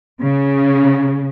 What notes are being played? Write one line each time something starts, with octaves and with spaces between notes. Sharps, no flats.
C#3